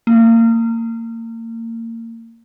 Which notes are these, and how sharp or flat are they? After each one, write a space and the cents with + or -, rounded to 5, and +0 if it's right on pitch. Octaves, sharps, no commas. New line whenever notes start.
A#3 -30